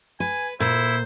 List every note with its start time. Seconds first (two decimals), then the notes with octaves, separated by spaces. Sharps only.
0.20 B4 G#5
0.60 A#2 E4 C5